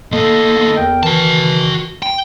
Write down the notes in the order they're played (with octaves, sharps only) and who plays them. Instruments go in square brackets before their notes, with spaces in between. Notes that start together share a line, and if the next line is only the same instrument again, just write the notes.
[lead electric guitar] D2 A#3 [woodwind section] A4 D#5
[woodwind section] E2 A#4 G5
[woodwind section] D#3 E3 [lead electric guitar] F#4 A5
[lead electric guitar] G5